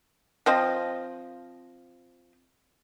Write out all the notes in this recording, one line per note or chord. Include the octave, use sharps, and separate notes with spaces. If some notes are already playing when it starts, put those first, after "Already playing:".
F3 C4 D#5